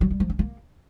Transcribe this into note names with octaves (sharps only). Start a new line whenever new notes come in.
F#3
G3
F3
C#4
A#3